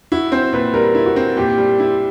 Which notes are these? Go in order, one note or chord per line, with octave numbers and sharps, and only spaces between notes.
E4 F#4
C4 C5
A#2 B4
G3 A#4
E4
F#4
C4
A#2 G4
G3
E4